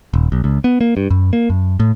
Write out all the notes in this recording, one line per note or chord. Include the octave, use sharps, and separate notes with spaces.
D#1
B1
C#2
B3
A#3
G2
F#2
A#3
F#2
A2